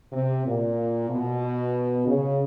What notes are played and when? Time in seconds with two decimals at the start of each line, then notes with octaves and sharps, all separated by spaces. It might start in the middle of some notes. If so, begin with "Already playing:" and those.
0.13 C3
0.46 A#2
1.10 B2
2.07 C#3